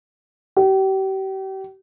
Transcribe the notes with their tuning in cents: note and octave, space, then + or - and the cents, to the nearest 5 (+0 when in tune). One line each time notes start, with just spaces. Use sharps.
G4 -35